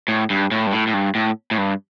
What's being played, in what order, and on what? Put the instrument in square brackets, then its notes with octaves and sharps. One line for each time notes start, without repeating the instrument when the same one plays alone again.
[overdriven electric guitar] A2
G2
A2
G2
A2
A2
G2
A2
A2
G2